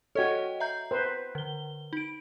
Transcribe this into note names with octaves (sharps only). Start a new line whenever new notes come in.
F#4 A4 C#5 D#5 G5
E5 A#5 G6
B4 C5
D3 G7
D#4 D7